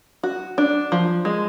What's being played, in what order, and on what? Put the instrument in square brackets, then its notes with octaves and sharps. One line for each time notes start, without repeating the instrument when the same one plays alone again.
[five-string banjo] F#4
D4
F3
G#3